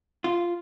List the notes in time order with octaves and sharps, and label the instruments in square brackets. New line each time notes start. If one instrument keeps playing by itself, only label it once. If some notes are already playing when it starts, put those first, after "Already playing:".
[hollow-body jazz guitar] F4